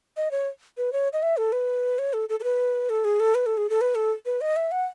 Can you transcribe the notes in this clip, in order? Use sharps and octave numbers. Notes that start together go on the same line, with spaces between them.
D#5
C#5
B4
C#5
D#5
E5
A4
B4
C#5
A4
A4
A4
B4
A4
G#4
A4
B4
A4
G#4
A4
B4
A4
B4
D#5
E5
F#5